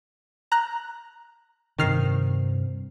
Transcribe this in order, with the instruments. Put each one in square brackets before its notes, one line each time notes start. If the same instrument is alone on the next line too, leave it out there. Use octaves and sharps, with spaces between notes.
[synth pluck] A#5 F#6
[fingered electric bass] G2 C3 [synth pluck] D#3 F6 C7